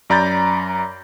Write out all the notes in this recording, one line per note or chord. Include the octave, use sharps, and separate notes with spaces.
F#2 D5 A#5 B5 G6 A6